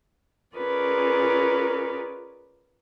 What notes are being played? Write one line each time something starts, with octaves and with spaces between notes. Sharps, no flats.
C#4 F4 G#4 A#4 B4 D5